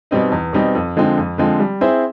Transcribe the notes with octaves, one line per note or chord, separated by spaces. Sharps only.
B2 G3 C4 D#4
E2
B2 G3 C4 D#4
F2
D3 F3 G#3 C4
F2
D3 F3 G#3 C4
G3
C4 E4 G#4 C5